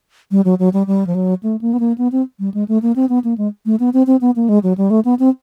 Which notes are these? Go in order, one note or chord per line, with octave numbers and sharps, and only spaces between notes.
G3
F#3
F#3
G3
G3
F3
F#3
A3
A#3
B3
A#3
B3
C4
G3
G#3
A3
A#3
C4
B3
A#3
G#3
A3
B3
C4
C4
B3
A#3
G#3
F#3
G3
A3
B3
C4